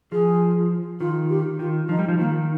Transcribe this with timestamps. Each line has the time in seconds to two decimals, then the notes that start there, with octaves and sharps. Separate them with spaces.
0.12 F3 G#4
1.00 D#3 F4
1.30 G4
1.59 D#3 F4
1.89 F3 D#4
1.99 G3
2.08 F3
2.19 D#3 A#3